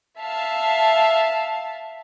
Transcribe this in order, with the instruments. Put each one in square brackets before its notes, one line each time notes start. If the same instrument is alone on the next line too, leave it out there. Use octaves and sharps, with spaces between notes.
[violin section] E5 F5 A5